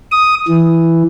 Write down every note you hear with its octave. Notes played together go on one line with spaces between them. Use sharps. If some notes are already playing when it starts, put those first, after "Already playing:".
D#6
E3